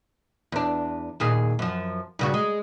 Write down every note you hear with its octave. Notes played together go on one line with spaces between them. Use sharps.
E2 D4
D#2 A#2 G#4
F#2 F3
G2 C#3 F#4
G#3